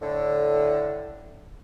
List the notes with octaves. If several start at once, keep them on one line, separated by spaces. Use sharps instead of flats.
A2 D3